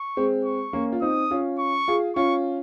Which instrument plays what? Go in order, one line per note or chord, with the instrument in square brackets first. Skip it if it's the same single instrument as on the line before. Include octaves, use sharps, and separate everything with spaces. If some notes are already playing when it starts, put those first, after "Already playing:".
Already playing: [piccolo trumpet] C#6
[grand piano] G#3 C4
[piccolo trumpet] C#6
[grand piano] A#3 C#4
F4
[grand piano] C4 D#4 [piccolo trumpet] D#6
[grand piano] C#4 F4
[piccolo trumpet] C#6
[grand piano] F4 G#4
[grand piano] C#4 F4 [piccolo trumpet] C#6